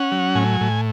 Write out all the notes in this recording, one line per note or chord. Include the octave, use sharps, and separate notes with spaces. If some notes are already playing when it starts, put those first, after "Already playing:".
Already playing: C#4 F#5
F#3
A2 G#5
A2